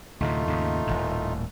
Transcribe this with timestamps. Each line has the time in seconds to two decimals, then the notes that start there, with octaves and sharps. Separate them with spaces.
0.20 D2 A2 C3 A3 D#4 F4
0.47 D#2 G#2 C#3
0.87 D#1 G#1 A2